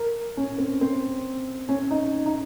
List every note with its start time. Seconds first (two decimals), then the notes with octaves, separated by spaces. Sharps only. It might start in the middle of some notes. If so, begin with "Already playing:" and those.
Already playing: A#4
0.37 C#4
0.58 C4
0.81 C4
1.69 C#4
1.91 D#4
2.26 D#4